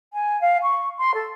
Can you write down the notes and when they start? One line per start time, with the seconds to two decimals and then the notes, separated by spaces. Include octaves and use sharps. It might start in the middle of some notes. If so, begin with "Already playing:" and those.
0.13 G#5
0.41 F5
0.62 C#6
0.98 C6
1.14 A4